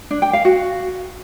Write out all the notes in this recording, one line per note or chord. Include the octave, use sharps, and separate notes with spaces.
D4
G5
F5
F#4